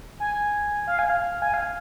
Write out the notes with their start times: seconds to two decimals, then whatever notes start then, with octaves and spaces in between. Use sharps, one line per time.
0.20 G#5
0.87 F5
0.99 G#5
1.09 F5
1.42 G#5
1.54 F5